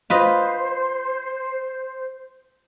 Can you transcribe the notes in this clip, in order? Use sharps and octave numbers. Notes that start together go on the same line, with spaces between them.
F4 B4 C5 D#5